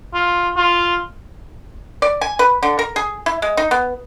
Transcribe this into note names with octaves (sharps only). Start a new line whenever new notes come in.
F4
F4
D5
G#5
B4
D3
A#4
G#4
E4
G#3
D#4
B3